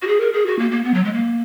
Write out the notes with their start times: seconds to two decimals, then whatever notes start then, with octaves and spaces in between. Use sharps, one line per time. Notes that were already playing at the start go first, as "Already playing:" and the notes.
0.02 F#4
0.07 G#4
0.21 A#4
0.33 G#4
0.46 F#4
0.59 A#3
0.71 A#3
0.84 B3
0.94 F#3
1.04 G#3
1.13 A#3